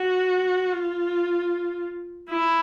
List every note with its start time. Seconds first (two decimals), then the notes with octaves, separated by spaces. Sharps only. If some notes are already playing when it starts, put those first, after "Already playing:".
Already playing: F#4
0.72 F4
2.30 E4